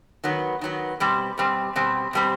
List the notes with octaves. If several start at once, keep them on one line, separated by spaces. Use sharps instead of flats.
D#3 F#3 B3
D#3 F#3 B3
B2 G3 C4
B2 G3 C4
B2 G3 C4
B2 G3 C4